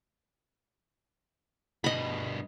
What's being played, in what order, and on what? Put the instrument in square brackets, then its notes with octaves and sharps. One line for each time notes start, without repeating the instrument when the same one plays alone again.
[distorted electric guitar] G2 B2 [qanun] D#5 B5